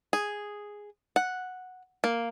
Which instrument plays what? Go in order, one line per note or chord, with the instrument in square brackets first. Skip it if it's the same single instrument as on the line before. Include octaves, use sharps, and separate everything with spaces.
[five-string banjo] G#4
F#5
A#3